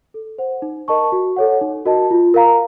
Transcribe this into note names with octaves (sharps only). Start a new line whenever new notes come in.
A4
C5 F#5
D#4
A#4 D#5 A5 C#6
F#4
A4 C#5 F#5
D#4
F#4 A#4 D#5 A5
F4
A#4 F5 A#5